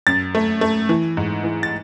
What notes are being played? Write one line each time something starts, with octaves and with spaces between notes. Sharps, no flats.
F#2 A6
A3
A3
E3
G#2
E3
A6